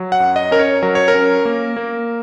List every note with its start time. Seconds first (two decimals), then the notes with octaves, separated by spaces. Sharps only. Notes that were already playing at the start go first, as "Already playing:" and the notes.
Already playing: F#3
0.12 F#5
0.20 F#2
0.36 D#5
0.51 C#4 A#4
0.59 C#5
0.82 F#3 A#4
0.95 C#5
1.08 A#4
1.14 C#4
1.45 A#3
1.77 A#3